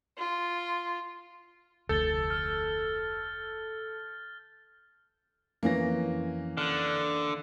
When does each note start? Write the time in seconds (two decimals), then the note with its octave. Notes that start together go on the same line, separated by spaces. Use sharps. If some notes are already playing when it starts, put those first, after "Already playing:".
0.18 F4
1.89 F1 D2 A4 G6 A6 G7
2.30 F6
5.63 F2 E3 A#3 C#4 A#6
6.57 D3 F6 F#6